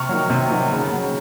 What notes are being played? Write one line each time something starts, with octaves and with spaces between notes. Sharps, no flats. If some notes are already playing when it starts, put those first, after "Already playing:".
Already playing: C3 C#6 F6
D#3 F#3
C3
D#3 F#3
C#3
F#3